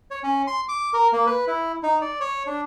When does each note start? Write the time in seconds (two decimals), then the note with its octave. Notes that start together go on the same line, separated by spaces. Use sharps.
0.11 C#5
0.23 C#4
0.47 C6
0.69 D6
0.93 A#4
1.13 A#3
1.27 B4
1.47 E4
1.83 D#4
2.01 D5
2.20 C#5
2.46 D4